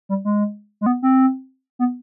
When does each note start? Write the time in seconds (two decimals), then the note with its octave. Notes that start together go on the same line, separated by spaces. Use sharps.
0.09 G3
0.25 G#3
0.81 G#3
0.86 B3
1.02 C4
1.79 B3